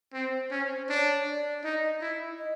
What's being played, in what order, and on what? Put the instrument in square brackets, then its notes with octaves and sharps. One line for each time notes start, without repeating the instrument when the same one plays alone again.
[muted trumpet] C4 [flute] C5
[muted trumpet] C#4 [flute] C5
[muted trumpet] D4 [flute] C#5
[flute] D5
[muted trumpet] D#4 [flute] D#5
[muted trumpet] E4
[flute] D#5